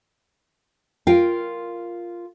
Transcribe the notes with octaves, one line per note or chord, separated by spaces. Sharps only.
F4 A#4 F5 G5